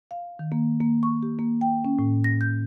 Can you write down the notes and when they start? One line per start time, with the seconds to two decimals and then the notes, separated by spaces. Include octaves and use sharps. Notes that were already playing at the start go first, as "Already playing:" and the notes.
0.11 F5
0.39 D#3
0.52 A#3
0.81 A#3
1.03 C#6
1.23 G4
1.39 A#3
1.61 G5
1.85 C#4
1.99 A2
2.24 A#6
2.41 G6